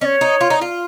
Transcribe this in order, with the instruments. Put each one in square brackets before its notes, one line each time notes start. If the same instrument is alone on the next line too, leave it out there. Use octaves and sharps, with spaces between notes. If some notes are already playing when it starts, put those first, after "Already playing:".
[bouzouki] C#4 [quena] C#5 D#5
[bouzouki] D#4
F4
D#4
F4